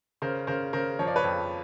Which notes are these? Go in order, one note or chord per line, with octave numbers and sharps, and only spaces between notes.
C#3 A#4 C5
C#3 A#4 C5
C#3 A#4 C5
F3 C#5
D5
B4 C#5
F2